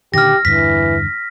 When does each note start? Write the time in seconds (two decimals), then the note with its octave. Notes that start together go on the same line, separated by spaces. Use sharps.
0.14 A#2 D3 D#3 G4 F6 A#6
0.45 E2 G2 D3 E3 B6